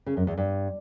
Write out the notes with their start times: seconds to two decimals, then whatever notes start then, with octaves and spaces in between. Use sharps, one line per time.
0.06 C#3
0.17 F#2
0.27 E2
0.38 G2